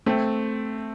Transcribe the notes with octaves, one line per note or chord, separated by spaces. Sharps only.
A3 C4